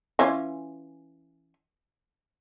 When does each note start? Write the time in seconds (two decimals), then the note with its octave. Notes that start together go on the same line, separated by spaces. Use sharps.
0.19 E3 C#4 F4